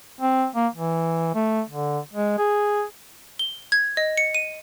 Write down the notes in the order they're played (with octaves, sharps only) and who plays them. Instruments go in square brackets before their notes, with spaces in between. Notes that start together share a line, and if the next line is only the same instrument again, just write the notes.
[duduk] C4
A#3
E3
A3
D3
G#3
G#4
[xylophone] G7
G#6
D#5
C#7
D#7